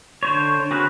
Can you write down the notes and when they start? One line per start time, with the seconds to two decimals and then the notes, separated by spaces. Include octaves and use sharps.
0.23 D3 C5 C#5
0.71 C4 F#4 G#4 A#4 B4